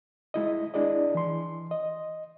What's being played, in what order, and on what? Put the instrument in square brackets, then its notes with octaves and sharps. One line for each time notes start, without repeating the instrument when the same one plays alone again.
[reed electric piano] G#3 E4 D#5
D4 E4 G#4 D5 D#5
E3 C6
D#5